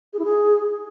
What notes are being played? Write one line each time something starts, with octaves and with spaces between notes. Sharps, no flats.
G#4
E4
G#4